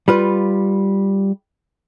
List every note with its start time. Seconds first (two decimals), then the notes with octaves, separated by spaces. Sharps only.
0.08 G3 F4 B4